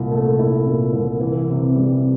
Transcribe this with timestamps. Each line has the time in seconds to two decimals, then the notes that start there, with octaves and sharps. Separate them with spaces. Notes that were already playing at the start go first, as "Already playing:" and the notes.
Already playing: C2 A#2
0.11 A3
0.39 E4
0.66 A#2
0.93 C2
1.20 E3
1.49 C3
1.75 G3